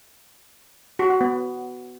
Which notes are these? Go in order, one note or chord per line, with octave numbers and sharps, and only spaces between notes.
F#4
F#4
B3